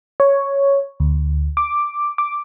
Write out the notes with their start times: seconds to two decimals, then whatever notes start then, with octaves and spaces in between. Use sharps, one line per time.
0.20 C#5
1.00 D2
1.57 D6
2.18 D6